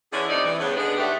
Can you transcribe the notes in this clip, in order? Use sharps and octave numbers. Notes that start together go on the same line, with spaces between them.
D3 E3 C#4 D4 E4 G#4
G2 C3 A3 D#4 D5
E3
G2 C#3 B3
D#2 D3 G#3 B3 D4 G#4
D2 A2 D#3 A3 G4 F#5